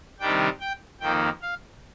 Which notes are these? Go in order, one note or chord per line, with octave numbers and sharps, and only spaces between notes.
C3 D#3 G3 D4 G5
G5
F2 D#3 A#3 D#4 G5
F5